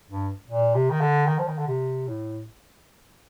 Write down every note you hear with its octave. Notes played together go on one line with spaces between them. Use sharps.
G2
A#2
C3
D#3
D3
D#3
F3
D#3
D3
C3
A2